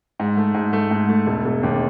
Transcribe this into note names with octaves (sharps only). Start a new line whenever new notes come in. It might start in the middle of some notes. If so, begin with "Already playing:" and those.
G#2
A3
G#2
A3
G#2
A3
E1
E1
D#2